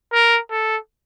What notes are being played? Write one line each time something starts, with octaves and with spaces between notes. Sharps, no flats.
A#4
A4